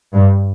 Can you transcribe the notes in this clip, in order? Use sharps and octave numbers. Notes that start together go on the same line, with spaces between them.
G2